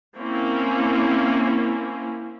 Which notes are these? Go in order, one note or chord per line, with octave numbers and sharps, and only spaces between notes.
A#3 C4 C#4 E4